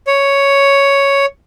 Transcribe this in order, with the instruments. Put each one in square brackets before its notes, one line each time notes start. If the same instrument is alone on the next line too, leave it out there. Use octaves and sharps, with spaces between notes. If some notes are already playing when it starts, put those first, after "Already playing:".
[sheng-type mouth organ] C#5